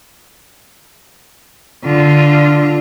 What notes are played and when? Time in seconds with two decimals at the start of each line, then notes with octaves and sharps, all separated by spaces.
1.84 D3 F4